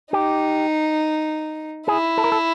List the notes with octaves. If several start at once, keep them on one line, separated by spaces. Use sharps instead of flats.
D#4 G4
E4 G#4
A4
A#4
A4